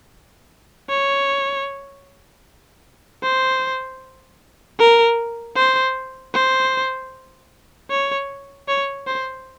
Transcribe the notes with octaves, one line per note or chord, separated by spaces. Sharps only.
C#5
C5
A#4
C5
C5
C#5
C#5
C5